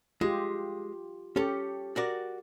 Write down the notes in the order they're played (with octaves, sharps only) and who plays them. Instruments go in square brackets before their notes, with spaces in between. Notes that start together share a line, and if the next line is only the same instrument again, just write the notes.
[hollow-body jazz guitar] G#3 [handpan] F4 G4
[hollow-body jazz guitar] C#4 A4 [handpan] G4
[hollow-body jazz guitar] F#4 A#4 D5